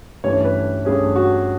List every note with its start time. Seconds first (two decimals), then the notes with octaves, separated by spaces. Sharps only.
0.24 G2 E3 A3 C#4 C#5
0.45 B4
0.85 G2 E3 A3 C#4 G#4
1.16 F#4